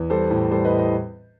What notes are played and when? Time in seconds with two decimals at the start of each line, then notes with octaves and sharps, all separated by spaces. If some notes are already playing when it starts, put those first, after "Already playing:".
Already playing: E2
0.10 G3 A4 C5
0.30 A2
0.51 G3 A4 C5
0.64 B4 D#5
0.71 A2
0.78 B4 D#5